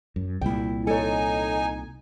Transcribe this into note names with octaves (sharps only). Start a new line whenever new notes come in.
F#2
C2 A#2 E4 G5
D#4 A4 C#5 G#5